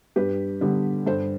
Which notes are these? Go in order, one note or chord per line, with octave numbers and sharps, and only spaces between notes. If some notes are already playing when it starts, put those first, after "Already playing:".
G2 G4 B4
D3 G3 B3
G2 A4 C5